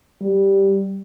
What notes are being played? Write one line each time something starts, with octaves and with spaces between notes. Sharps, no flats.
G3